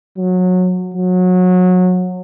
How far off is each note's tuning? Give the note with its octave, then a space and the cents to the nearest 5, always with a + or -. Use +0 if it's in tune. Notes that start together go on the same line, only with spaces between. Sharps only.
F#3 -20
F#3 -25